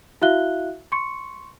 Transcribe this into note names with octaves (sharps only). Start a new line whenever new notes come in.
E4 F#4 E5 F5 F#6 G7
C6 C#6 C#7